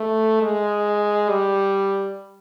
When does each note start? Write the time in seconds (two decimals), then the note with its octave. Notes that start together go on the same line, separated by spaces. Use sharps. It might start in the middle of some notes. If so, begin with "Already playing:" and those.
Already playing: A3
0.42 G#3
1.29 G3